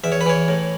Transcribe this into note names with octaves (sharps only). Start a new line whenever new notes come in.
E2 E5
C#5
B4
E3 C#5
A2